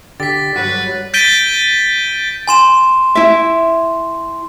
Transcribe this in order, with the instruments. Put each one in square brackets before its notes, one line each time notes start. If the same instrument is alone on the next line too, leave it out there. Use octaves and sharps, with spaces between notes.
[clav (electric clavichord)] D3 G4 [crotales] A6 B6
[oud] G2 D3 F#3 [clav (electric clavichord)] F#4 [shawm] B4
[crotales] G6 A6 B6 D7 D#7 G7
[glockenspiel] G#5 C6 E7
[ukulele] E4 E5